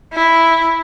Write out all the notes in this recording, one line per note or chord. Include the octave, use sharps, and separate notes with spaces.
E4